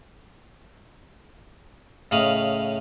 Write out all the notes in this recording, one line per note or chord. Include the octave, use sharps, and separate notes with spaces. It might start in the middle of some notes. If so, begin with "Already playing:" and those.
A2 C#3 D#5 F5 B5